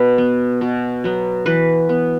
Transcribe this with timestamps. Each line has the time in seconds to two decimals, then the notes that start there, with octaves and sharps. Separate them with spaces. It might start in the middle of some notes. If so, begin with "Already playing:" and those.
Already playing: B2 B4
0.18 B3
0.61 B2
1.04 F#3 B3
1.46 E3 B4
1.89 B3